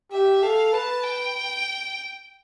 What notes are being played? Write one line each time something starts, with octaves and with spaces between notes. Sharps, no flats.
G4 E5
A4 F5
B4 A5
G5